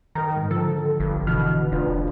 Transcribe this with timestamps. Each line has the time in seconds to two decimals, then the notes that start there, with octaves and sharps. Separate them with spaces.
0.15 D#3 A#4 A#5
0.36 G#2
0.51 D3 F3 A4
1.00 G1
1.27 B2 D3 E3 F6
1.72 F1 D4 F4 B4